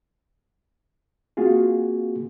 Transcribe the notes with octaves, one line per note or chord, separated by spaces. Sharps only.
A#3 C4 F4 F#4 G#4